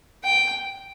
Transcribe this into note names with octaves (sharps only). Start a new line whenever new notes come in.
G5